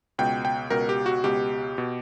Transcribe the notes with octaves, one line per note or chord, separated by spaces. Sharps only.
C#2 B2 G5
G5
C#2 B2 A#4
G4
F#4
C#2 B2 G4
B2